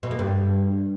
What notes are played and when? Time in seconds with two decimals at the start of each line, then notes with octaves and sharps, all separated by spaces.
0.03 B2
0.11 A#3
0.19 G2